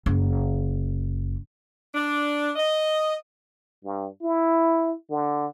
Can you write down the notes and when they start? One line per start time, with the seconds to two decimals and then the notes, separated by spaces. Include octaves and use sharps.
0.06 F#1
1.94 D4
2.56 D#5
3.85 G2
4.22 E4
5.10 D3